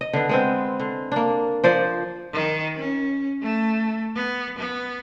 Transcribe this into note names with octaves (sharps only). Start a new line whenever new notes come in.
D#5
D3 B3
G#3 B3 C4
D3
A#3 D4
F3 C5 D5
D#3
C#4
A3
B3
B3